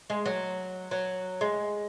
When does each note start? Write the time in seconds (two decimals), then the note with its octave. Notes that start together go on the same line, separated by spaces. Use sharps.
0.10 G#3
0.25 F#3
0.91 F#3
1.41 G#3